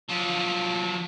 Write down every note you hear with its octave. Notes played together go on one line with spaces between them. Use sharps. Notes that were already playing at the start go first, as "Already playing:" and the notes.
F3 F#3